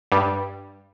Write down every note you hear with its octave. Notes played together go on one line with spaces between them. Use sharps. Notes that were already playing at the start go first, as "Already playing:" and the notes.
G2 G3